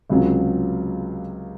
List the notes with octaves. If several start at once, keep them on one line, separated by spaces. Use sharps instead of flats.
C#2 C3 F#3 C#4 F4